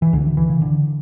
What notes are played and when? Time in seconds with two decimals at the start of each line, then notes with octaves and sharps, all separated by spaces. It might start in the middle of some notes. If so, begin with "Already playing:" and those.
0.02 E3
0.13 C#2 D3
0.37 E3
0.50 C#3
0.62 D3